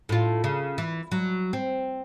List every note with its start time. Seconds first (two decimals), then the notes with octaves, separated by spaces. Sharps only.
0.09 A2 F4
0.44 C#3
0.78 E3
1.12 F#3
1.53 C4